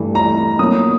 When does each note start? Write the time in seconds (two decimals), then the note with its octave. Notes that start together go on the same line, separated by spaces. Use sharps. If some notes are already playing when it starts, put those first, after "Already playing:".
Already playing: G2 E3 A3
0.15 A#5
0.59 B2 F#3 A#3 D#6